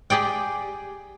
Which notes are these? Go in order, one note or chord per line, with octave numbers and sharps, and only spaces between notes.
G4 G#4 D5 G5